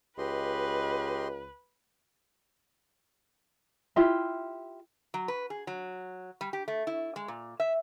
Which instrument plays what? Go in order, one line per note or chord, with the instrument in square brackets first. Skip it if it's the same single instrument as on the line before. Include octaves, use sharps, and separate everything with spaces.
[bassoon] C#2 [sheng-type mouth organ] G4 D#5 C6 [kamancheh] B4
[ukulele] E4 F4 G4 E5
[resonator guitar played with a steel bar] F#3
B4
G#4
F#3
G3
G4
A3
E4
G#3
A#2
E5